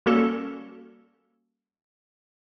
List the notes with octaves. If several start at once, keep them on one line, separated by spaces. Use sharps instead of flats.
G3 A#3 C#4 F#4 A4